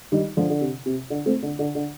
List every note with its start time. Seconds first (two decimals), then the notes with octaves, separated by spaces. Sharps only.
0.12 D#3 G3
0.37 D3 F3
0.50 D3
0.61 C3
0.86 C3
1.10 D3
1.26 A3 C4
1.43 D3
1.59 D3
1.75 D3